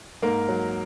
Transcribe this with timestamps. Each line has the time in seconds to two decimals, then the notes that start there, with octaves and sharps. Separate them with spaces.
0.22 G#2 A#3 A#4
0.49 F#3